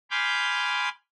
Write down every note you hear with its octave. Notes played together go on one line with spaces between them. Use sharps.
G#5 B5 C6 D6 F6 G6